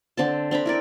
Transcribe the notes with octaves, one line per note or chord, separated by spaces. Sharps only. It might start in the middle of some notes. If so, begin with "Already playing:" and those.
D3 C4 A5
C4 D4 A#5 B5
E4 A#4 D5